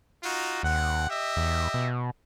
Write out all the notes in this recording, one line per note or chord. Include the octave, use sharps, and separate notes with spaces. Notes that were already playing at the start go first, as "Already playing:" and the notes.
D#4 F4 F#4
D#2 C4 F#5
G4 D#5 E5
E2
B2